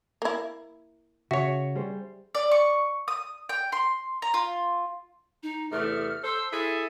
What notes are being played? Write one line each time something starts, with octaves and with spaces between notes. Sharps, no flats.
A#3 E4
C#3 F#4 C#5 E5
G3 G#4 C5
D5
C#6
D#6
G5
C6
A#5
F4
D#4
E2 C3 A3 F6
A4 C5 E6
E4 G#4 A4 E5